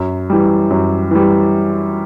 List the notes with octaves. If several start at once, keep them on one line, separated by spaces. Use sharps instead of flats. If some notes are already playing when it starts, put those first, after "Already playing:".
Already playing: F#2
E3 G3
F#2
E3 G3